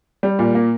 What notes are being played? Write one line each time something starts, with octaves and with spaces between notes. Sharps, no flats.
G3
A#2
A#3